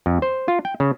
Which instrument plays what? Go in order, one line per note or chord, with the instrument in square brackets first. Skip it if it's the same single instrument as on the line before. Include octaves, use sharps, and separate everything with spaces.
[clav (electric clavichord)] F2
C5
F4
G5
C#3